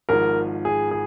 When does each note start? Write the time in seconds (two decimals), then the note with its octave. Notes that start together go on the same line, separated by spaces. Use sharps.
0.09 G#1 G#2 F3 A#4
0.65 G#4
0.91 G#4